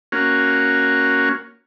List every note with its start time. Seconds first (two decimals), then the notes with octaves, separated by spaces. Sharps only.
0.12 A#3 C#4 F#4